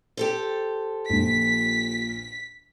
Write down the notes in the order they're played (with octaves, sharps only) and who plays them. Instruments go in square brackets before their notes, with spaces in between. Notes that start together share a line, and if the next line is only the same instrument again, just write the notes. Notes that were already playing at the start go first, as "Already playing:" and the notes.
[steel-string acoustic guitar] G4 A4 C5
[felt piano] A#1 A#2 [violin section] B6